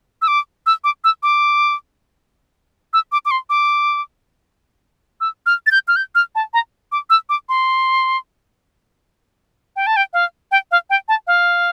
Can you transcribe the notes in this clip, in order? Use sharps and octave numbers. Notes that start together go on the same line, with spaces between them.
E6
D6
E6
D6
E6
D6
E6
D6
D6
C6
D6
E6
F6
A6
G6
F6
G6
F6
A5
A#5
D6
E6
D6
C6
G5
A5
G5
F5
G5
F5
G5
A5
F5